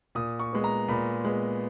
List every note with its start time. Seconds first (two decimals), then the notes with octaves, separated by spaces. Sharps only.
0.15 A#2 D#6
0.40 C#6
0.52 G#3 B3
0.64 A#5
0.88 A#2 B5
1.24 G#3 B3